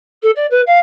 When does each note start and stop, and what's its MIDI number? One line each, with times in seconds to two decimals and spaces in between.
0.22 0.31 69
0.35 0.46 74
0.50 0.61 71
0.66 0.79 77